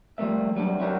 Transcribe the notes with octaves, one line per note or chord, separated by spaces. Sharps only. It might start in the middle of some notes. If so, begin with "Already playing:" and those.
F3 G3 A3 A#3 E5
F#3 G3 C#4 D4
C#4 D4 E4 F#4 G4 A#4